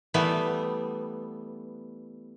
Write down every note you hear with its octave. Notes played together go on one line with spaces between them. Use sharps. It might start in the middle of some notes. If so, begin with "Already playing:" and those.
E3 G3 A3 B3